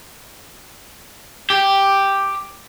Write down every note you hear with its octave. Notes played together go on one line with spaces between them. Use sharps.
G4